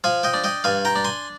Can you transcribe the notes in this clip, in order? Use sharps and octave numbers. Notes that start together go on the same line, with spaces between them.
F3 F5 G#5
D#5 G5
D4
D#5 G5
G2 F5 G#5
G5 A#5
D4
G#5 C6